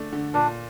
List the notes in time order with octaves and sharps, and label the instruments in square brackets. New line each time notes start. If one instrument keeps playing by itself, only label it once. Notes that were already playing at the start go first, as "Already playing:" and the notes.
Already playing: [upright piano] D3 A3 D4
D3
[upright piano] A#2 [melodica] D4